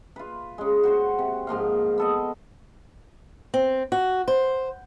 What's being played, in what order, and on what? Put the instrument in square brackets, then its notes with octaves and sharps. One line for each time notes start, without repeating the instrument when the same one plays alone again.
[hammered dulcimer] F4 B4
C#3 G#3
F#4 C5 F#5
C3
G#2 F3 A#3 F5
B3 A4 D#5
[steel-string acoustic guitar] C4
F#4
C5